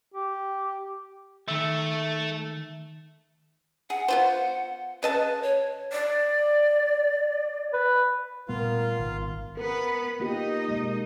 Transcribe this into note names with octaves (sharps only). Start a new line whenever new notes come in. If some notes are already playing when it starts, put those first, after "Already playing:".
G4
D#3 A3 E5
G#4 F#5
B3 F4 C5
C#3 B4 D#5 A5
C#5
D5
B4
A#2 G3 A3 B3 F4 A#4 F5
G#1 D#3
B3 A#4 B4
A#3 D#4 F4 G4 D#5
B2 G#3 A#3